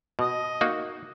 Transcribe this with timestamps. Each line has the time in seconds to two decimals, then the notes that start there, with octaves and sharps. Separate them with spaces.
0.19 B2 D#5
0.61 A#3 D#4 F#4